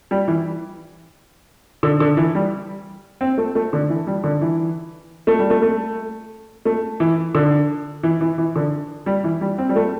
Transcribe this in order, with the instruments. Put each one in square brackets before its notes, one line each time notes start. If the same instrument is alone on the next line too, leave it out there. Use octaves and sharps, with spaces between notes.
[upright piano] G3
E3
D3
D3
E3
G3
C4
A3
A3
D3
E3
G3
D3
E3
A3
G3
A3
A3
A3
E3
D3
E3
E3
E3
D3
G3
E3
G3
C4
G3
A3